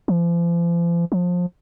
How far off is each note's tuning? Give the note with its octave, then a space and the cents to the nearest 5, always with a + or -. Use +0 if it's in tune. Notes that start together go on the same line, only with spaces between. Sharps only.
F3 -40
F3 +25